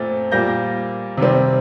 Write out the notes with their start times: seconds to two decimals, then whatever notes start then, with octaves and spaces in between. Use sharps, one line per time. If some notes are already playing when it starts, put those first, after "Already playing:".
Already playing: A#2 A3 C4 A6
0.31 A#2 G3 A#3 G6 A#6
1.17 C3 D#3 G3 C4